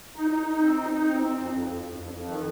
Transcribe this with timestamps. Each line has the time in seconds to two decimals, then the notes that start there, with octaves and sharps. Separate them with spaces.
0.16 D#4
0.31 D#4
0.46 D#4
0.61 C4
0.77 D#4
0.92 D#4
1.07 C4
1.22 C4
1.37 F2
1.53 F2
1.68 F2
1.83 F2
1.98 F2
2.14 F2
2.29 D#3